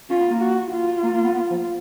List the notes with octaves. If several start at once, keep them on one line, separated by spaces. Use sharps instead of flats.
C#4 F4
B3
A#3
F#4
F4
A#3
A#3
B3
B3
F3